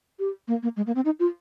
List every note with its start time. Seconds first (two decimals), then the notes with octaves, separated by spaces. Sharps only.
0.19 G4
0.48 A#3
0.63 A#3
0.77 G#3
0.87 A#3
0.95 C4
1.05 D#4
1.20 F4